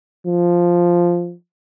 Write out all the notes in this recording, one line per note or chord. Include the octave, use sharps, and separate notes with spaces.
F3